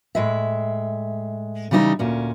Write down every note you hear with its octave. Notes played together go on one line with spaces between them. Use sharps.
A2 G#3 E5
C#3 E3 G3 B3 D#4
D2 A#2 C#4